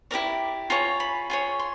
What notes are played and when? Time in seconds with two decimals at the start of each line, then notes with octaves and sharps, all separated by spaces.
0.11 E4 G4 A#4 D5 A#5
0.70 F4 G#4 C#5 A#5
1.00 B5
1.30 F4 G#4 C#5
1.59 C6